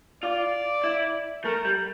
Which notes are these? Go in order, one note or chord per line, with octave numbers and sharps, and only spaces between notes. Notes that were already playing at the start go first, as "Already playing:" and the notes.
F4 D5
E4
A3 A#4
G3